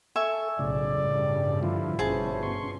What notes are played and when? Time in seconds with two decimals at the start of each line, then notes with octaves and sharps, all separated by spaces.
0.16 A4 E5 G#5 C#6
0.59 B1 A2 C#3 D5
0.97 G2 G3
1.63 D3 F3 E4 F4
1.99 G1 B2 C#4 G#4 C5 A5
2.43 C6 C#6